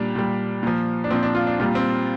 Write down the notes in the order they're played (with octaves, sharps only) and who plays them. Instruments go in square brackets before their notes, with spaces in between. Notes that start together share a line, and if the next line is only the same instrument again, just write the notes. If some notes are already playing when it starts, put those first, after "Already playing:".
Already playing: [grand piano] A#2 G3 D4
A#2 G3
A#2 F3
D4
A#2 F3 C4
D4
F4
D4
A#2 G3 F4
C4